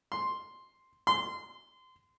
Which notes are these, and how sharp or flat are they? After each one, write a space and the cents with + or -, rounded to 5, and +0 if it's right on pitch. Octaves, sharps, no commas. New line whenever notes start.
C6 +0
C6 -25